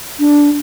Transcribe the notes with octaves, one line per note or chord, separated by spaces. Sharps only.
D4